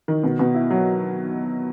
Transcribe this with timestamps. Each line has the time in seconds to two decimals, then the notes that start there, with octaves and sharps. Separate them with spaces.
0.08 D#3
0.24 B2
0.39 B2
0.55 E4
0.71 F#3